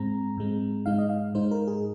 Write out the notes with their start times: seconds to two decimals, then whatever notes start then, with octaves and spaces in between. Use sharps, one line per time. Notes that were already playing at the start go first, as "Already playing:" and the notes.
Already playing: G#2 G#3 C4 A#5
0.38 G#2 G#3 C4
0.86 G#2 G#3 D#4 F5
0.98 D#5
1.09 F5
1.35 G#2 G#3 D#4 C5
1.51 A#4
1.67 G#4